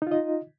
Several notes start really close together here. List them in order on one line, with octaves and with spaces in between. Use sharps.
D#4 F4 D#5